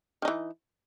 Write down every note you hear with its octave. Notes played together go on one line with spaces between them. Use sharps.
D#3 E3 D#4